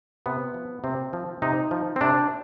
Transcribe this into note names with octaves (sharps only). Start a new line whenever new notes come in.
C3 B3
F3
C3 C4
F3
C3 D#4
F3
C4
C3 D4